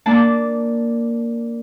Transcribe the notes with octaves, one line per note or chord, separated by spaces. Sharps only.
A#3 D4 A5